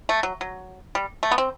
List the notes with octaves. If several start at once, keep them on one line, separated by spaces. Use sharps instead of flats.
A3
F#3
F#3
G3
A3
B3
C4